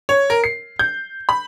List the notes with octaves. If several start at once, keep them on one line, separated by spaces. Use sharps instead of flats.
C#5
A#4
C7
G6
B5